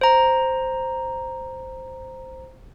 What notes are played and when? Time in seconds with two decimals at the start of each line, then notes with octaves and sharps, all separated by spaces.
0.01 C5 A#5